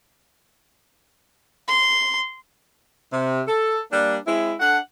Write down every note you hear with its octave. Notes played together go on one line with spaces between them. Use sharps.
C6
C3
A4
G3 A#3 D4
G#3 C4 E4
D4 A4 F#5